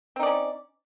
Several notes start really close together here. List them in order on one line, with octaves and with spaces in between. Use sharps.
C4 D#4 D5 C#4